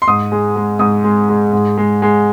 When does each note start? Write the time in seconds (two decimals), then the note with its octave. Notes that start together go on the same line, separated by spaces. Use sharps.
0.02 C6
0.08 G#2 D#6
0.32 G#3
0.56 G#3
0.79 G#2 D#6
1.04 G#3
1.29 G#3
1.53 G#2
1.78 G#3
2.02 G#3